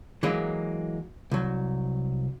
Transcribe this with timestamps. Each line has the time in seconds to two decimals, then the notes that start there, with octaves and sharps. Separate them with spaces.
0.23 E3 F#3 G#3 A#3
1.31 C2 F#3